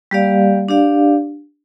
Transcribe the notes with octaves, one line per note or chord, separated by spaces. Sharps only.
G3 A#3 G4 D5 F5
D4 G4 D5 F5